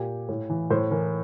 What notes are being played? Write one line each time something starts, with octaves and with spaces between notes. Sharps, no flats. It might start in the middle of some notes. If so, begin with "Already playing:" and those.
Already playing: A#2 G4
A2
E3
A2 C5
E3 A#4